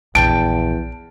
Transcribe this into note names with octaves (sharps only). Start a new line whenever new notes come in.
A#1 E2 G5 A5 D7